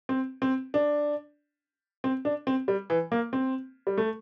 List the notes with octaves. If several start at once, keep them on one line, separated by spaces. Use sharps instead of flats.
C4
C4
D4
C4
D4
C4
G3
E3
A#3
C4
G3
A3